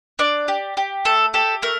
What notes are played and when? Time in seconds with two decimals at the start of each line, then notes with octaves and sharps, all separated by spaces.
0.19 D4 D5
0.48 G4
0.77 G4
1.05 A3 A4
1.34 G4 A4
1.62 A3 A#4